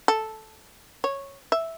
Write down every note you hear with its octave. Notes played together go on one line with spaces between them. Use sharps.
A4
C#5
E5